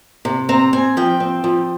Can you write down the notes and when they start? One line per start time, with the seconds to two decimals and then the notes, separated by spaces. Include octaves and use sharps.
0.25 C3
0.49 C4 A#5
0.73 C4 G#5
0.97 F3 G5
1.20 C4
1.44 F3